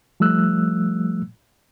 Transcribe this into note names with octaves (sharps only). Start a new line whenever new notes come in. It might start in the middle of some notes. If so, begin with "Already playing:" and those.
F3 G3 A3 E6 F#6